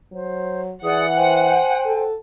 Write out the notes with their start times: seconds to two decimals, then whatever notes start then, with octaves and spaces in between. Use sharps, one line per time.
0.12 F#3 C5
0.84 E3 G#4 D5 F#5 D#6
1.15 C5 G5 G#5
1.86 A4